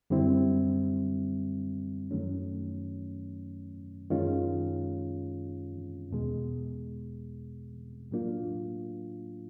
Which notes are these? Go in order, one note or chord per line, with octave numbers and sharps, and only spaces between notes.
F#2 D3 G3 C4 E4
F#2 D#3 F#3 A3 C#4
F#2 D#3 G#3 C#4 F4
E2 B2 G#3
A2 F#3 A#3 D4 F4